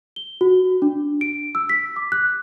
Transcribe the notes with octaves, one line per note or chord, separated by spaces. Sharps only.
G7
F#4
D4
D7
E6
B6
D6
F#6